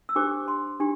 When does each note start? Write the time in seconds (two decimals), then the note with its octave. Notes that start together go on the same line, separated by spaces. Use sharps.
0.09 E6
0.16 D4 G4 C5 D6
0.48 C6
0.80 D4 G4